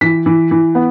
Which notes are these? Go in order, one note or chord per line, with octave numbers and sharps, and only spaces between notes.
E3 B6
E3
E3
B3